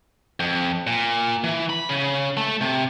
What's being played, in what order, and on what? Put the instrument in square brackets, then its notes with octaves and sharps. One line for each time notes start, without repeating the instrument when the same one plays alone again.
[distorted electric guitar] F2
A#2
E3
B5
C#3
A3
C3